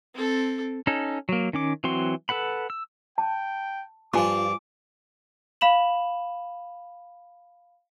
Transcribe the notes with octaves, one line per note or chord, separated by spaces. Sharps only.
C4 A4
C#4 D#4 A4
F#3 A#3
D#3 C#4 D6
E3 F#3 C4 F#4 C6
A4 B4 F#5 B5
E6
G5 A5
G2 F3 F4 G#5 C#6 D6
F5 B5 E7 F#7